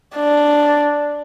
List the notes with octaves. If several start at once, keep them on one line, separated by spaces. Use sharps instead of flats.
D4